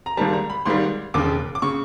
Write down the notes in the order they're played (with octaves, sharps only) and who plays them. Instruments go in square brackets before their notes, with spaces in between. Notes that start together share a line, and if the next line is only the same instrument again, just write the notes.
[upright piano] A#5
G#1 G#2 D#3 G3 A5
A#5
B5
G#1 G#2 D#3 G3 C6
E1 D#2 C#3 D6
D6
C#3 C#6